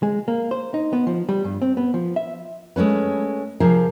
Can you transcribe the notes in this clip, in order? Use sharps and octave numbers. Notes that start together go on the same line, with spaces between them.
G#3
A#3
C5
D#4
B3
F3
G3
G2
C4
B3
F3
E5
G#3 A3 C#4 B4
C3 F3 G#4 A#4